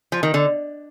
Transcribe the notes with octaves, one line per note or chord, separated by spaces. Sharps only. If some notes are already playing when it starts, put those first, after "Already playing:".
F3
D#3
D3